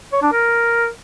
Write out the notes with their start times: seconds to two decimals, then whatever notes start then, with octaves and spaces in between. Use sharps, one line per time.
0.12 C#5
0.22 D4
0.32 A#4